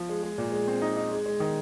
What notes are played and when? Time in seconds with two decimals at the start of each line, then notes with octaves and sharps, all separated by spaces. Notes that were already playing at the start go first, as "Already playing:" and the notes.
Already playing: F3
0.09 G#3
0.23 G#3
0.38 A#2
0.52 G#3
0.68 C4
0.82 D#4
0.97 D#4
1.11 G#3
1.26 G#3
1.40 D#3